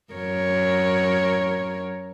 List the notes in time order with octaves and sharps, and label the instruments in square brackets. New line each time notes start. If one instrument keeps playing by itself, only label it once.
[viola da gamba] F#2 A#4 C#5